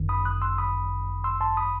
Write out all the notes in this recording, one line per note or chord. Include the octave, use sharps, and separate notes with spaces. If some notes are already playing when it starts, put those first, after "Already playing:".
Already playing: G1 F#2 D#3
B5 D#6
D#6 F#6
C6 E6
B5 D#6
C6 E6
A5 C6
B5 D#6